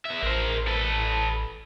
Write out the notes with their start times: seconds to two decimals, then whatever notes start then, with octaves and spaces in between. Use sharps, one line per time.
0.05 B3 E5
0.22 A1 A#4 C5
0.67 A4 B4